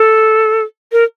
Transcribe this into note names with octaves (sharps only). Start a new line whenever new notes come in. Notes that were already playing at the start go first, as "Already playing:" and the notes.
Already playing: A4
A#4